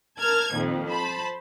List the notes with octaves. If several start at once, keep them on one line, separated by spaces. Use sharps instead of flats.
A#4 A5 F6 G#6
F2 A#2 D#3
C5 A5 B5